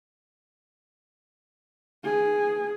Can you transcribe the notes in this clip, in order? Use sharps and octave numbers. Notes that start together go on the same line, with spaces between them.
G#4